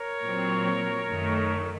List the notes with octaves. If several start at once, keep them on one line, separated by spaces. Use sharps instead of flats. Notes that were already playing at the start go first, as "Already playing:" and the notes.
Already playing: A#4 C#5
A#2 F#3 C4
F#2 D#3 A3